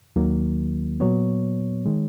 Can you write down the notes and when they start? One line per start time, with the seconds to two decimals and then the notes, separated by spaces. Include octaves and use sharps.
0.16 D#2 D#3 F#3 A#3
1.00 A#2 F#3 B3 C#5
1.86 D#3 G#3